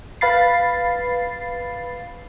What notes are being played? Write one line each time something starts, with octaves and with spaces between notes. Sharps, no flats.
B4 F5 B5 A6 C7